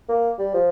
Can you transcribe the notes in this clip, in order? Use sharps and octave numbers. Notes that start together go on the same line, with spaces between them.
A#3
G3
F3